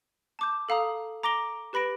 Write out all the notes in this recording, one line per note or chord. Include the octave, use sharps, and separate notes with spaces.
A5 D6 G6
A4 F5 A#5 D#6
A#5 D6 A#6 D7 G7
G4 B4 B5 A#6 D7